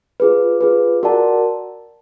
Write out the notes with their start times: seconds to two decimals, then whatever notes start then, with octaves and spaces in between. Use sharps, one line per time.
0.20 F4 G#4 B4
0.61 F4 G#4 B4
1.03 F#4 A#4 D5 F#5 A5